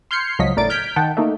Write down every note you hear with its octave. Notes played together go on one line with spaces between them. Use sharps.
C6 F6 G6 G#6 C7 C#7
C#2 F3 F#3 D#5 B6
G1 A2 A#4 D5 A6 D7
F6 G6 G#6 B6 D7
D#3 F#5 G5 A5
A3 A#3 D#4